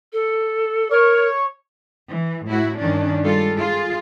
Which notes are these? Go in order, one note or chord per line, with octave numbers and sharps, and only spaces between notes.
A4
A#4 C#5
E3
A2 E4 F#4
G2 D#3 C#4 D4
G3 G#3 F4 A4
F4 G#4